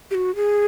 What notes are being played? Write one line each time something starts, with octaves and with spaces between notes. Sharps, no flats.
G4
F#4
G#4